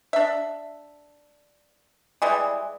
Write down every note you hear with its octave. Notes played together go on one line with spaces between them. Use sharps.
D4 E5
E3 G3 G#3